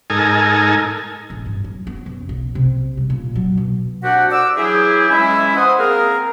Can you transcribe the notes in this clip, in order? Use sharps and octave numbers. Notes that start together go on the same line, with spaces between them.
G#2 D#4 A4 A#4 G#5
A1
G2
F#2
B3
F#2
B1
C3
G3
A#2
F#3
B2
C2 D4 F#4 G4 F#5
D6 E6
E3 F#3 E4 G4 G#4
E3 G#3 C#4 E4
C5 F#5 D#6
A#3 C4 G#4 A#4